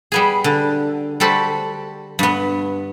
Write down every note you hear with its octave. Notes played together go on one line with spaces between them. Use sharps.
G3 B3 G#4
D3
G3 F#4 A4 C5 B5
G2 B3